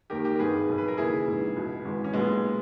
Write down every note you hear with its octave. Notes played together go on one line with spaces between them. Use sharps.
D#2 D#3 G4 A#4
G4 A#4
A#4
G#1 G2 D#3 G#4 B4
B1 B2
B4
A#4
D#2 C#3 E3 E4 G#4
A#1 G#2 E3
C#2 B2
G#1 G#2 E3
C#4
B1 A#2 G#3 B3